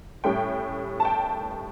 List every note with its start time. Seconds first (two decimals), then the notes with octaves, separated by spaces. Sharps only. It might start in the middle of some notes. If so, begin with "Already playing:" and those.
0.24 A2 G3 C#4 G5
1.00 A5
1.05 G5